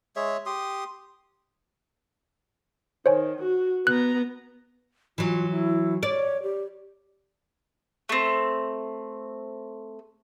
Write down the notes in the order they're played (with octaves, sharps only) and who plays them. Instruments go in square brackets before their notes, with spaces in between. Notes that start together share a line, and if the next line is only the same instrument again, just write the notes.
[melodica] G#3 G#4 C#5 E5
G4 C6 D#6
[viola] D#3 [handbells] C5 C#5 G#5
[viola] F#4
[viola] B3 A#5 [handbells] F#6
[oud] E3 F#3 [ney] F4
[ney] E4
[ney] C#5 [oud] D5
[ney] G4
[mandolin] A3 C4